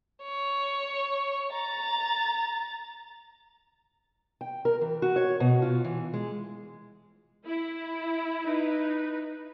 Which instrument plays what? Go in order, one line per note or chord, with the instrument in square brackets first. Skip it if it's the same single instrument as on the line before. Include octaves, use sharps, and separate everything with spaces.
[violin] C#5
A#5 A6
[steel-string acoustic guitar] G5
A#4
E3
F#4
C#5
B2
F4
E3
G#3
[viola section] E4
[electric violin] D#4 B4